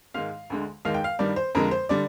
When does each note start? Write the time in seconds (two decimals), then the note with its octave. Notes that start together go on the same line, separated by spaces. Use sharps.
0.14 G#2 D#3 G#3 F5
0.50 D2 D3 G#3
0.85 D#2 D#3 G#3 F5
0.94 G5
1.04 F5
1.19 G2 D#3 G3 D5
1.36 C5
1.55 F2 D3 G#3 A#4
1.71 C5
1.89 D3 G3 D5